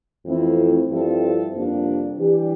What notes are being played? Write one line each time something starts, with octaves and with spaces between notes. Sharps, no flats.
F2 E3 A3 C4 E4
G2 F3 C4 E4 A4
F2 C3 G3 A#3 D4
E3 G3 D4 G4